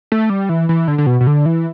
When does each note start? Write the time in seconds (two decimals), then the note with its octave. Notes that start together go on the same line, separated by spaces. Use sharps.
0.12 A3
0.30 G3
0.49 E3
0.69 E3
0.88 D3
0.98 D3
1.06 B2
1.21 B2
1.27 D3
1.46 E3